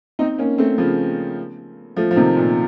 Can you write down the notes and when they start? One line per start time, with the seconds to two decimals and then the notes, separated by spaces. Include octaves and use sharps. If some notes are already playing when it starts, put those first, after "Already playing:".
0.19 C4 D#4
0.38 A#3 C#4
0.58 A3 C4
0.78 C#3 F3
1.96 F3 A3
2.11 F3
2.16 C3 D#3
2.36 A#2